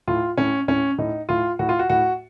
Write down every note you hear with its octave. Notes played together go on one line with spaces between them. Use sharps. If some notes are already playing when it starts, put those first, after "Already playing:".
A2 F4
A2 C#4
A2 C#4
A2 D#4
A2 F4
A2 F#4
F4
F#4
A2 F#4